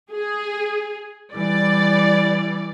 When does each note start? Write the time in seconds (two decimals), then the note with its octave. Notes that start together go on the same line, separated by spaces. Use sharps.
0.12 G#4
1.33 E3 G3 D5